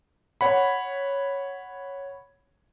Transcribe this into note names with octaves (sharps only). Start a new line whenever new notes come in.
C#5 F#5 B5